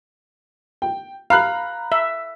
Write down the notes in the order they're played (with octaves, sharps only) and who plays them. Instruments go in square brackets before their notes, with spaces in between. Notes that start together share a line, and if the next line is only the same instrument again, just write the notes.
[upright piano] G5
[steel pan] F5 [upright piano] A#5 B5 F#6
[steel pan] E5